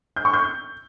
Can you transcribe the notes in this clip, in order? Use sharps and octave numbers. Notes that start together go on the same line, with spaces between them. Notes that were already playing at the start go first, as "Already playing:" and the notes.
G6
C#6
G6